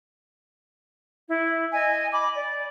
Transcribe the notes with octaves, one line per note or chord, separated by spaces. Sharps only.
E4
D#5 G#5
B5 D6
D5